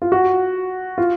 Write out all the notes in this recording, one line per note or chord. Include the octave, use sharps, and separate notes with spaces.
F4
F#4
F4